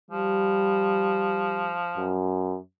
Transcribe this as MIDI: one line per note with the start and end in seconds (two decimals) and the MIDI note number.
0.11 2.21 53
0.11 1.77 55
1.97 2.57 42